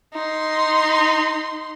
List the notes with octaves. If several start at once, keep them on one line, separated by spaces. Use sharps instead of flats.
D#4 C6